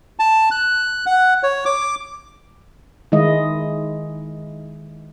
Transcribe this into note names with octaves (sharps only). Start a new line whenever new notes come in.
A5
F#6
F#5
C#5
D6
D#3 G#3 E4 D#5